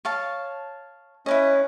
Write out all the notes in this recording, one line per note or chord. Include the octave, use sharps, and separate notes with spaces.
C#5 F5 A5
C#4 E4 B4 D#5